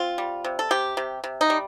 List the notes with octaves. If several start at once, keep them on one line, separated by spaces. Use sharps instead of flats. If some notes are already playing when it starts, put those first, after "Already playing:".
Already playing: C4 F4
G3
C3
A4
C3 G4
C3
C3
D#4
G3